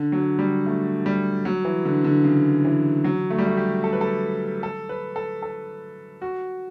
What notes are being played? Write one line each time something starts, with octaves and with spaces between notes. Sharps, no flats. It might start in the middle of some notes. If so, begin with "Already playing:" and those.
Already playing: D3
F#3
G3
A3
G3
F#3
E3
D3
D3
C#3
E3
F#3
A3
G3
A3
G4
A4
B4
A4
A4
B4
A4
A4
F#4